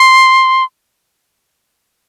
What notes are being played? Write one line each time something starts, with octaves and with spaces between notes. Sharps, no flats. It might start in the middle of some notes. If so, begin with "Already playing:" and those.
Already playing: C6